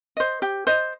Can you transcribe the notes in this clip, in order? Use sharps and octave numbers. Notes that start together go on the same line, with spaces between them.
C5 D#5
G4
C5 D#5